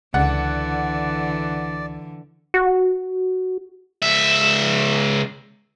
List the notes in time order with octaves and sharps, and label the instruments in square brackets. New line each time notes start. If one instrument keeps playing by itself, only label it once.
[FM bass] C#2 [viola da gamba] D3 E3 [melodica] D5 [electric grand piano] F#5
[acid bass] F#4
[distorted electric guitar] C#2 E5